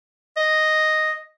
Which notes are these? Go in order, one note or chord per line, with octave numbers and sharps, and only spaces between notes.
D#5